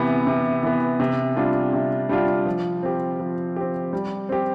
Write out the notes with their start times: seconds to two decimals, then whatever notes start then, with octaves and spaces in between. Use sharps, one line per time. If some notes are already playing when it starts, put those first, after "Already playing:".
Already playing: C3 E3 B3
0.27 C3
0.63 E3 B3
1.00 C3
1.36 G3 D4 F4
1.73 C3
2.09 G3 D4 F4
2.46 F3
2.83 C4 G4
3.20 F3
3.56 C4 G4
3.93 G3
4.29 C4 G4